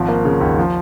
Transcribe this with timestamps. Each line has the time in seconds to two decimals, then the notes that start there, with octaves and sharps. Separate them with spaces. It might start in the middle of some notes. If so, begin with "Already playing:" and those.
Already playing: G#1 F3
0.08 A#3
0.25 C#3
0.41 D#2
0.58 F3